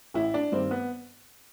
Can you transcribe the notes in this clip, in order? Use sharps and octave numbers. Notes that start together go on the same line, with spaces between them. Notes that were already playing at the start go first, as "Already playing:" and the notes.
A1 E4
D4
G2 D#3 C4
B3